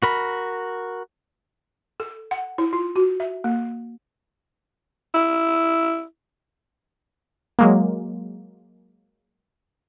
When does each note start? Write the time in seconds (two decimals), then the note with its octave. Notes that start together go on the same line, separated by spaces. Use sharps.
0.02 F#4 A#4 B5
2.00 A4
2.31 F#5
2.58 E4
2.73 F4
2.96 F#4
3.20 E5
3.44 A#3
5.14 E4
7.59 F#3 G#3 A#3